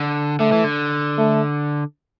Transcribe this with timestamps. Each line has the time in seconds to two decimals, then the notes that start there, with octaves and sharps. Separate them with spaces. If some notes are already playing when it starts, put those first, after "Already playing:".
Already playing: D3
0.40 D3 A3
0.52 E3
0.64 D3
1.18 A3